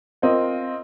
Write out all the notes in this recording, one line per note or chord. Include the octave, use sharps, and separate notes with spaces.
C4 F4 A#4 D#5